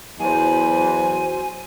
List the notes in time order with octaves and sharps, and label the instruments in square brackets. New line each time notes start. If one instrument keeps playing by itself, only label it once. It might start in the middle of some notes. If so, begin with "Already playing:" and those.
[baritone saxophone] E2 [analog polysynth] F#3 C5 [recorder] G#5